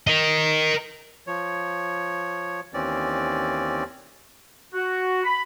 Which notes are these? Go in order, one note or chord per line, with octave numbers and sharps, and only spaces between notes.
A#4 D#5
F3 C#5
D#2 E3 C4 C#4 D5
F#4
B5